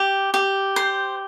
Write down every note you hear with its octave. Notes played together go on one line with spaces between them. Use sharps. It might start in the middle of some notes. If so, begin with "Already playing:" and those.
Already playing: G4
G4
C5